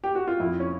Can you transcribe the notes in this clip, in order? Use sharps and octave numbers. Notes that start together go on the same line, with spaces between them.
G4
F#4
F4
F2 E4
C#4